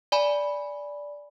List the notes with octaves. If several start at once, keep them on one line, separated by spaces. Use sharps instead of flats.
D5 G#5 B5